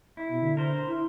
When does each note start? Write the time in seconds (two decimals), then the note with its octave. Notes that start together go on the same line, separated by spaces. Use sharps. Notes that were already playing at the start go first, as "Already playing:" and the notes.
0.17 E4
0.29 B2
0.42 D3
0.57 A#4 C5
0.87 E4